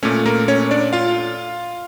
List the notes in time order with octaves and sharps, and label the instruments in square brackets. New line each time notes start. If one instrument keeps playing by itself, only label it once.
[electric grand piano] A#2 A3 C#4 C#5
A#3 A#4
C#4 C#5
D4 D5
F4 F5